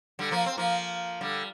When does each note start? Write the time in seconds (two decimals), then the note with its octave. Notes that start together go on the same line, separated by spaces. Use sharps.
0.19 D3 G3
0.31 F3 A#3
0.46 C4
0.57 F3 A#3
1.21 D3 G3